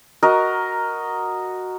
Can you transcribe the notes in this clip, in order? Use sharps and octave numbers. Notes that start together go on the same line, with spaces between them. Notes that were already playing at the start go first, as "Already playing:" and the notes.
F#4 A#4 D#5 A#5